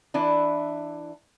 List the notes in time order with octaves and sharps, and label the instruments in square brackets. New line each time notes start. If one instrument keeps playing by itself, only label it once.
[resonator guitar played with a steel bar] E3 D4 E4